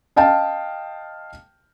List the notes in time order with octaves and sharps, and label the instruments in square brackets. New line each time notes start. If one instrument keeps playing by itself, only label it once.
[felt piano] D#5 F5 G5 A5